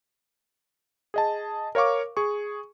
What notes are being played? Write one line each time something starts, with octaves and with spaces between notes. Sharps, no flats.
G#4 D#5 A5
A#4 C#5 F5 C#6 D6
G#4 C#6